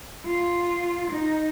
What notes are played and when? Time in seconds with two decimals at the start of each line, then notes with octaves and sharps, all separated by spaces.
0.25 F4
1.11 D#4